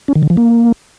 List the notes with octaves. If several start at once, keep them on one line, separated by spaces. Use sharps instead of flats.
C#4
D#3
D3
F3
A#3